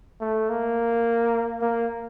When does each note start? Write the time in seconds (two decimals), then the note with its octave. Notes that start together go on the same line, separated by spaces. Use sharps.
0.21 A3
0.49 A#3
1.61 A#3